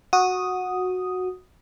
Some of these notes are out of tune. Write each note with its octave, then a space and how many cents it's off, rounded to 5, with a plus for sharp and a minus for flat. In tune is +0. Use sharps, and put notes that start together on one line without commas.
F#4 -10 D#6 +0